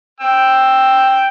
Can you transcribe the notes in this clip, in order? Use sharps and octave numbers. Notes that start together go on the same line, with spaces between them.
G5 E6